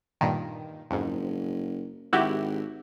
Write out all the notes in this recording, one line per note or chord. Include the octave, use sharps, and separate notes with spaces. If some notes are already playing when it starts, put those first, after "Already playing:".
G2 A#2 D#3
F#1 F2 G#2
G#1 E4 F#4 G4